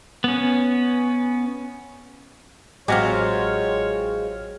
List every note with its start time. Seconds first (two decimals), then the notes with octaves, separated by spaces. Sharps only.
0.24 B3 C#4
2.88 A1 F#3 G#3 C4 F4 G4 C#5 F6